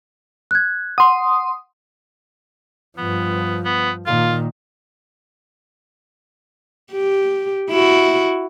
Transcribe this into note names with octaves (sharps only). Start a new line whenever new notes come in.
F#6 G#6
F#5 C6 D#6
G2 F3 B3
B3
A#2 D#3 F4
G4
E4 F#4